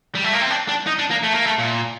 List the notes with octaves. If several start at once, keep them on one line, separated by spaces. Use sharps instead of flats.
G3
A3
A#3
C4
D4
D4
D#4
D4
A#3
A3
A#3
A3
A#2